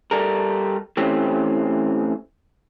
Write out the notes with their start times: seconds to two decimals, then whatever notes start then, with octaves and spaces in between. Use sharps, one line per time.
0.11 G3 A4 A#4
0.97 E3 A3 C4 C#4 G4